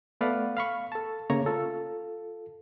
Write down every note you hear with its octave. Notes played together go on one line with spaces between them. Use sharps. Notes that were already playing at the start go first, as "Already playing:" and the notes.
A3 B3 B4 D5 F5 F#5
F5 B5 C#6
A4 A5
C#3 A3 A#3 C#5 A#5 C#6
F4 A4